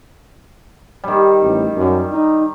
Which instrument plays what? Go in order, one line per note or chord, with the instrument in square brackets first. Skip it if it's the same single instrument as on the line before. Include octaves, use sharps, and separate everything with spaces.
[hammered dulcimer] D#3 G3
[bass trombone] A1
F#2
D#4